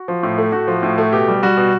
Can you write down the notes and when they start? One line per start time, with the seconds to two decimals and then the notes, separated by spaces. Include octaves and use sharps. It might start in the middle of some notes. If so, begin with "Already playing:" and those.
Already playing: F#4
0.08 F3
0.23 A2
0.38 A3
0.52 A2 F#4
0.68 F3
0.83 A2
0.98 A3
1.13 B2 G4
1.28 G3
1.43 G3 F#4
1.57 B2